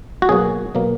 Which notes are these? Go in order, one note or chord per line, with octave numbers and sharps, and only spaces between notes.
F#4
B2 F#3 A#3 G#4
B2 F#3 A#3